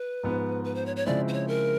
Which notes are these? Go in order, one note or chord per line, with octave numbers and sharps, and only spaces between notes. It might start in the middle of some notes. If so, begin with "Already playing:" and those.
Already playing: B4
G#2 F3 G#3 B3
B4
C5
C#5
C#5
C#3 F3 G#3 C4 E4 D5
C5
C#5
A#4